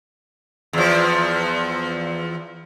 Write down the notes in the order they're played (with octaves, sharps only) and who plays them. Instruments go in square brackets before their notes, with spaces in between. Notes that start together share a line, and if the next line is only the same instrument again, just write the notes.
[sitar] E2 F3